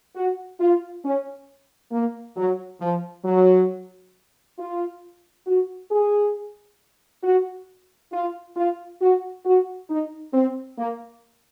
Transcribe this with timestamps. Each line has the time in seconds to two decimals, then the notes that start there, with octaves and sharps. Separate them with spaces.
0.16 F#4
0.60 F4
1.04 C#4
1.92 A#3
2.37 F#3
2.81 F3
3.25 F#3
4.59 F4
5.47 F#4
5.91 G#4
7.24 F#4
8.13 F4
8.57 F4
9.01 F#4
9.45 F#4
9.90 D#4
10.34 C4
10.78 A#3